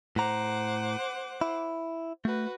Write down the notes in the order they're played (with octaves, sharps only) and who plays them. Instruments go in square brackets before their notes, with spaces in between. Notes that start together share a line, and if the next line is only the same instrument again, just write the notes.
[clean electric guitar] A2 A#5 [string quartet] C5 F#5 D6
[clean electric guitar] E4
[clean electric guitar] A3 [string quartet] F#4 B4